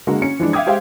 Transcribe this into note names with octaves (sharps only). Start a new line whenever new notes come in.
D3 G#3 A#3 F#4
C#4 C#7
E3 F3 G#3 D4
E5 F5 G5 D6 D#6 G#6
G#3 G4 C5 E5 F5 G5